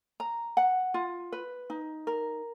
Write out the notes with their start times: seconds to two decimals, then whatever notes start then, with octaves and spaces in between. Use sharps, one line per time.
0.20 A#5
0.57 F#5
0.94 F4
1.32 B4
1.70 D#4
2.07 A#4